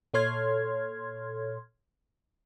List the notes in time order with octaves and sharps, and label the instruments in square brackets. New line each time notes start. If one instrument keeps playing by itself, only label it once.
[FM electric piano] A#2 A4 C#5 C6 F6 G#6